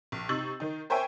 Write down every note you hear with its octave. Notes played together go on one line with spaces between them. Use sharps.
A#1
C3 D#4 C#6 E6 A6 F#7
D#3 D#4
A#4 C5 C#5 E5 G5 G#5